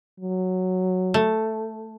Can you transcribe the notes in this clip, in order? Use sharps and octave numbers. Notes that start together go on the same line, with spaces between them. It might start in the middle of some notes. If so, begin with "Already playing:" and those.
F#3
A3